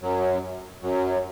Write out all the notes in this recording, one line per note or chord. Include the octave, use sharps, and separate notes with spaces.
F#2 F#3
F#2 F#3